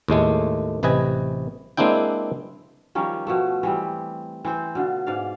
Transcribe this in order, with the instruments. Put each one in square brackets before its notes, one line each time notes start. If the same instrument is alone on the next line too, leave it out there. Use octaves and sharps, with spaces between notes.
[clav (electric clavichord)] D#2 A2 G#3 A3
A1 C3 B4 D#5 G#5
G#3 A#3 C4 D4 E4 G5
[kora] D#3 F3 G3 C#4
B2 F3 A3
E3 G3 C4
E3 C4 C5
B2 D3 F4
G#2 D5 F5